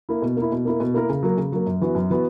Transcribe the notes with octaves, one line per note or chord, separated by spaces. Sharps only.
A#3 E4
B2
A#3
E4
B2
A#3 E4 A#4
B2
A#3 E4 A#4
C#3
F#3 A#3
C#3
F#3 A#3
F#2
E3 B3 F#4
F#2
E3 B3 F#4